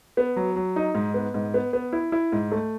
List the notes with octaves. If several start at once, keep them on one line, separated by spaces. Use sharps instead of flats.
B3
F#3
F#3
D#4
G#2
B3
G#2
B3
B3
E4
E4
G#2
A3